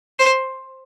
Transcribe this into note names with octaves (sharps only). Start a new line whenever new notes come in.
C5